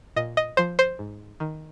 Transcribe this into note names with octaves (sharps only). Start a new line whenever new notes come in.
A#2 D#5
D#5
F3 C5
C5
G#2
D#3